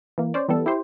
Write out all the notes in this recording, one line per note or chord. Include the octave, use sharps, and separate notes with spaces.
E3 A#3
C#4 C5 D5
E3 G3 B3 A4
E4 G4 C5